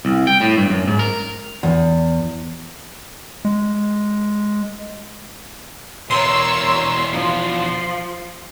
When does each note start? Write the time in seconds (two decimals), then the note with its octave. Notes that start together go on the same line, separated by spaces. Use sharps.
0.05 C2
0.27 G5
0.41 A2
0.57 G2
0.70 F#2
0.87 G#2
0.99 A#4
1.63 E2
3.45 G#3
6.10 E2 B2 A#4 C#5 C6 E6
7.13 F3